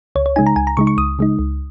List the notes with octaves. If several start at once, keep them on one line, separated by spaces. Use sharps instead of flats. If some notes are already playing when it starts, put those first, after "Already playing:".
C#2 C#5
C#5
C#3 G#3 D#4 G#5
A#5
C#2 G#5
A#5
C#3 G#3 D#4 C#6
C#6
C#2 D#6
C#3 G#3 D#4
C#2